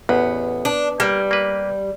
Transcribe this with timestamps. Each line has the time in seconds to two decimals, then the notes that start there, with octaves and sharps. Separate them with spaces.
0.09 A1 E2 B3
0.65 D4
1.00 G3 A#3
1.31 A#3 B4